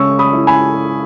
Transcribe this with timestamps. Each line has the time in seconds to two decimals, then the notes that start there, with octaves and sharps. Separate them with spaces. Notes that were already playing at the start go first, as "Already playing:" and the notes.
Already playing: C#3 G#3 C#4 C#6 E6
0.19 B5 D#6
0.33 E4
0.47 G#5 B5